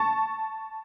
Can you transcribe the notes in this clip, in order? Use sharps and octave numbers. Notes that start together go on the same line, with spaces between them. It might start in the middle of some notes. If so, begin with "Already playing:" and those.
Already playing: A5 C#6